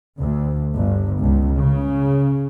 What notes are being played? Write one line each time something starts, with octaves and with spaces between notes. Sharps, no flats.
D2
G1
C#2
C#3